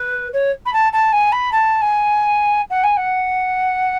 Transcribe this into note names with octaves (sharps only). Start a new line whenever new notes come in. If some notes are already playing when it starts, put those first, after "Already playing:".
Already playing: B4
C#5
B5
A5
A5
G#5
B5
A5
G#5
F#5
G#5
F#5